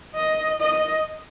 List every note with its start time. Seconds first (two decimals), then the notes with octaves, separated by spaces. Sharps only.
0.15 D#5
0.60 D#5